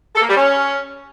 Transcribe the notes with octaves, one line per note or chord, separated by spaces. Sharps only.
A4
A#3
G3
C#4